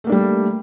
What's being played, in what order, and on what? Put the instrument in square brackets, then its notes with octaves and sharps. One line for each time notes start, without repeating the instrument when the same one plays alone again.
[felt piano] A3
A#3
D4
G3